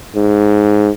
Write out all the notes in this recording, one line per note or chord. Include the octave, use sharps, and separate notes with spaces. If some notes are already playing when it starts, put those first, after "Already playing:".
G#2